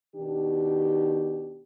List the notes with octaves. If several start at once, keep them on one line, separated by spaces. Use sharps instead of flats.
B2 D#3 D4 G4